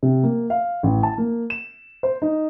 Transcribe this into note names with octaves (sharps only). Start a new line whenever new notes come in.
C3
A#3
F5
A1
A5
A#3
E7
C5
D#4